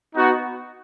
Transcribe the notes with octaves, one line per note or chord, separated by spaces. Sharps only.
B3 D#4 F#4